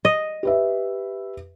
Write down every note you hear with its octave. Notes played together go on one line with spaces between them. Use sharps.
D#5
G4 B4 E5